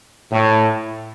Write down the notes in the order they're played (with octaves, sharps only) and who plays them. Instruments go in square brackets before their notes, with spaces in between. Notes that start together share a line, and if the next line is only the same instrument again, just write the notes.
[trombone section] A2